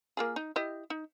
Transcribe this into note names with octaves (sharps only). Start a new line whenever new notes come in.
A#3 F4 G#4
D#4
E4 G4 D#5
D#4